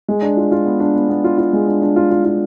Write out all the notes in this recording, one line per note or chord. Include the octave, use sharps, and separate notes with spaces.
G#3
D4
F4
F4
B3
D4
B3
B3
F4
F4
G#3
D4
D4
F4
F4
F4